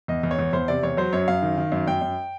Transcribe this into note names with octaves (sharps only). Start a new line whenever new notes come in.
E2 D#5
E2
C#5
E2
E2 C5
C3 D5
E2 C#5
F#3 C5
F#2 C#5
F#2 F5
D#3
D#3
F#2
F#2 G5
F#2